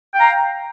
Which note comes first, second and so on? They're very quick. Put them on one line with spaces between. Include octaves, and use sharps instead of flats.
G5 F5 A#5